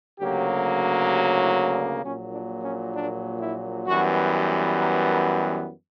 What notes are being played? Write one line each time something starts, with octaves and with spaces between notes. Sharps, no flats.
D2 C#3 F#3 A#3 G4
G4
E4
D4
A#1 A#2 F#3 C#4
D4
C#4
D4
E4
F#2 E3 G3 B3 F#4
G4
A#4
A#4
G4